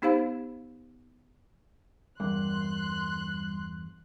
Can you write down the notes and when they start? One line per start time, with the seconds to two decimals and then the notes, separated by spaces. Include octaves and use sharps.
0.02 B3 D#4 G4 C5 F5 B5
2.20 E2 G2 G3 A#3 C6 F#6